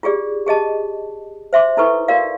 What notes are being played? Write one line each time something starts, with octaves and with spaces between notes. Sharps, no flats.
F4 G4 G#4 D5
G4 G#4 D#5 A5
C5 E5 C6 D6
D#4 E4 A4 B4 C#6
F#4 A#4 D5 F5